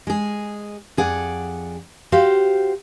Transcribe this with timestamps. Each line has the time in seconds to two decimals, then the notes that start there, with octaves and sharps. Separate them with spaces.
0.07 G#3 G#4
0.97 F2 G#4 D5 F#5
2.12 F#4 G4 C5 F5